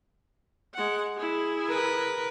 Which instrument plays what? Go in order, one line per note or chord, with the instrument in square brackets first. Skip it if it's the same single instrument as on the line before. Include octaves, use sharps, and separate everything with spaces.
[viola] G#3 F#5
E4 G#4
[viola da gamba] A#4 B4